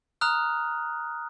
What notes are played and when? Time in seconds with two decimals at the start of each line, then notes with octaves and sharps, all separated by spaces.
0.21 A#5 D#6 F6 F#6